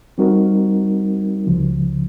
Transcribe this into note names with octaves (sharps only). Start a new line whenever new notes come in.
G3 C4 D#4 F#4 A#4
C#2 C#3 F3